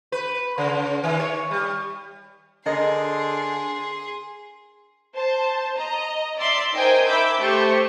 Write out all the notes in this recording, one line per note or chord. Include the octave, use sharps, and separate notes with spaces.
B4
C#3
D#3
C#5
G3
D3 G#4 A#4 D#5 C6
C5 A5
D#5 A#5
D5 E5 C6
D#4 A#4 C5 D#5 G5 G#5
E5 B5 D6 E6 G6
A3 G4 C5 C#6